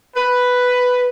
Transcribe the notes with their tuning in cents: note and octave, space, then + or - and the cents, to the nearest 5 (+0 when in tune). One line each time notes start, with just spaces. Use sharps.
B4 +5